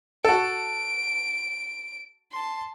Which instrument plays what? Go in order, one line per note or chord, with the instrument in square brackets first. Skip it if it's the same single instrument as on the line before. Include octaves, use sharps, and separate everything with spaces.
[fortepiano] F#4 A4 [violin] D7
[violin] A5 C6